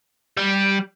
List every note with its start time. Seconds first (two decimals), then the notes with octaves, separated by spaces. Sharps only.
0.37 G3